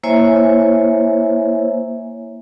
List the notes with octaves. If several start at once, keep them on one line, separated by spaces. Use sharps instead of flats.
A#3 E4 C5 C#5 E5 G#5